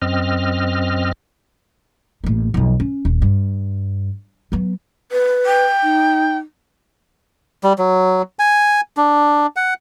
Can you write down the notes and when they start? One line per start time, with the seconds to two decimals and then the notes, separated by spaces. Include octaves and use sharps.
0.02 F#2 C4 D#5 F6
2.24 A1 A#3
2.54 B1 F2
2.80 C#4
3.05 D#1
3.22 G2
4.52 F#3 B3
5.12 B4
5.46 G5
5.83 D#4
7.64 G3
7.78 F#3
8.39 G#5
8.97 D4
9.56 F#5